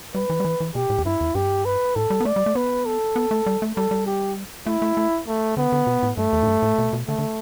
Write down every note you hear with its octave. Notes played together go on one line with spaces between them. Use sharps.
G3 B4
E3
G3
E3
E3
B2 G4
A2
E2
G2 E4
E2
G2 G4
B4
A2 A4
G3
B3
A3 D5
G3
A3
B3 B4
A4
B3
A3
G3
A3
G3 A4
G3
G4
A3 E4
A3
A3
A3
D3 B3
D3
B2
A2
G2 A3
E2
A2
G2
A2
B2
B2
D3 A3
D3